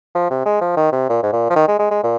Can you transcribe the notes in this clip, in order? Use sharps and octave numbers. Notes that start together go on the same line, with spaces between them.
F3
C3
G#3
F3
D#3
C3
A#2
G#2
A#2
F3
D#3
G#3
G#3
G#3
A#2